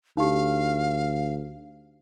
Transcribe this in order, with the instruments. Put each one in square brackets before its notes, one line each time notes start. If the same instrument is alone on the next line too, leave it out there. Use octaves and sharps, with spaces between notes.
[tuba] D2 [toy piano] D#4 G4 [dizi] F5